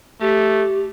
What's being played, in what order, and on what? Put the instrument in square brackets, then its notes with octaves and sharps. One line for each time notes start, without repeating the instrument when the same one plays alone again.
[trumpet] A3 [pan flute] G4